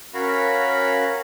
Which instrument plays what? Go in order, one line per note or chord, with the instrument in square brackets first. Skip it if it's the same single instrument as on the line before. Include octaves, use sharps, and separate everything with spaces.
[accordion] C#4 F#4 A#4 C#5 F5 B5